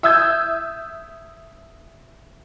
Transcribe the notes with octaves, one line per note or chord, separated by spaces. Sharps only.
E5 D#6 E6 G6 G#6